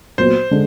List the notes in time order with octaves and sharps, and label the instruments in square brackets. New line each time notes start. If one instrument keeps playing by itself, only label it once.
[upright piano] A#2 F#3 B3 [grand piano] C5
[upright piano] D3 G#3